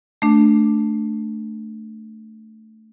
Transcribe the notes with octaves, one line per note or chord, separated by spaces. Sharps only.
A3 D4